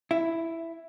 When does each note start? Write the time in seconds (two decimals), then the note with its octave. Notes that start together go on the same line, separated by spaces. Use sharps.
0.11 E4